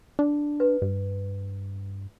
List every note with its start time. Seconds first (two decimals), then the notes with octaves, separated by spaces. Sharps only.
0.19 D4
0.60 B4
0.82 G2